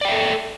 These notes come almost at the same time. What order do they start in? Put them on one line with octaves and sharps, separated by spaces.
D5 G5 E5 A4